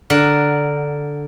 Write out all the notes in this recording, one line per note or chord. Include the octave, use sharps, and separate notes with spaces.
D3 A#4 F#5